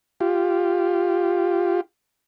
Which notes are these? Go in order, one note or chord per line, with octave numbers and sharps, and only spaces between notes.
F4 G4